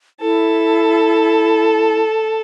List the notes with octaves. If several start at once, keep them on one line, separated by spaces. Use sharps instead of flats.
E4 A4